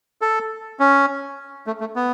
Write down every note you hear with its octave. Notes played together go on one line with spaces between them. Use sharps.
A4
C#4
A3
A3
B3